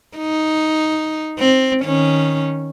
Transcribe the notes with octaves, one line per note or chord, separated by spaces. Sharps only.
D#4
C4
D#3 C#4